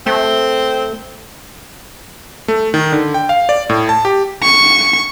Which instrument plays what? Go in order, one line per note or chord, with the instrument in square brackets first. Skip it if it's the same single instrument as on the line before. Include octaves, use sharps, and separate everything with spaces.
[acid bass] A3 [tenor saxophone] C4
[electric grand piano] A3
D#3
D3
G5
F5
D5
A2
A5
G4
[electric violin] C#6